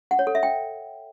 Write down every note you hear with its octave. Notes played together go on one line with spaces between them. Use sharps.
F#5
C#5
A4
E5
G5